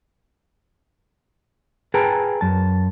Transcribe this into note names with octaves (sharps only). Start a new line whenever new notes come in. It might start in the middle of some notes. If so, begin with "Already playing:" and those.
G#4 B4 G5 A5 A#5
F#2 A5